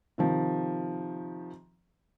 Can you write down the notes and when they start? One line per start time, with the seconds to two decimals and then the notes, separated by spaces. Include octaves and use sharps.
0.18 C3 D#3 F3